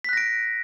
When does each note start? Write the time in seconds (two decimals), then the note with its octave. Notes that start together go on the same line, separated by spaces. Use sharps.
0.04 B6
0.09 F#6
0.13 A#6
0.17 D7